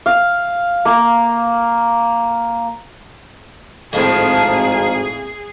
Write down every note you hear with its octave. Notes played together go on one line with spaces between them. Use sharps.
F5
A#3
G#1 F2 A2 D#3 F3 G#4